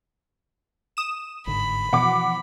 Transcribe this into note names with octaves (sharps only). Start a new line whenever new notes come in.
D#6 E7
G1 G#2 D3 B5
B2 E3 F3 F#5 D6